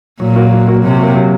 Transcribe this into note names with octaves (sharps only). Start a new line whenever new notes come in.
A#2 F#3
A#3 F#4
F#3
A#3 F#4
C3 F#3
A#3 F#4
F#3